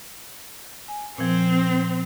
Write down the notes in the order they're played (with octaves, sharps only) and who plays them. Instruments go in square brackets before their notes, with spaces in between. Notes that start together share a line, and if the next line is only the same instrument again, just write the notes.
[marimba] G#5
[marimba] A#2 F3 [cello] C4